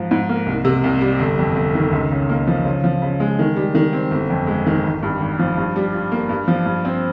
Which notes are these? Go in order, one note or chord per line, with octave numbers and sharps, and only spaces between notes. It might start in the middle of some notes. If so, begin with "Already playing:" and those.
Already playing: G#2 F3
G#2
A#3
C2
C3
C2
G3
G1
F2
G1
D#3
C#2
C#3
A#3
F3
C#3
F3
C#3
G#3
D#3
G3
D#3
C4
G1
F2
G#3
D#3
G#1
G2
G#1
F3
G2
G3
F4
A#3
G2
F3
G2
C4